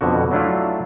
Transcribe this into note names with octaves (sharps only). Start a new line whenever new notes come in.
F2 B2 D3 F#4
F#3 A3 D4 E4 F4